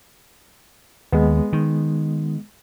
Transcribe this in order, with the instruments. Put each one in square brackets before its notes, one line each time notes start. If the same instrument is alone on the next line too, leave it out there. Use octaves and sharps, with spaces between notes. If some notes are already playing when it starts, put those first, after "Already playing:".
[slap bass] D#2 [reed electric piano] G#3 B3
[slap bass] D#3